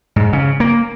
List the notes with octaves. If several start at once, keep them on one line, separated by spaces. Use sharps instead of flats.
G#2
C#3
A#3